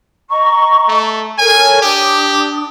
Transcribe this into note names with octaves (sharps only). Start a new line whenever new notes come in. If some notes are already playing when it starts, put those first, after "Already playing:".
D#5 A#5 C#6
A3
A4 A#4 C#5 G#5
D4 G4 D#6